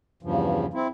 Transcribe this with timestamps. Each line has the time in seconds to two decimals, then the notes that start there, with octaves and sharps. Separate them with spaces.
0.23 E2 G2 C#3 F3
0.74 C4 E4